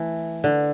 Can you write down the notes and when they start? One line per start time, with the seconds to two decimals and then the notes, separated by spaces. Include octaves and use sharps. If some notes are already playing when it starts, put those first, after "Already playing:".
Already playing: E3 A3
0.44 D3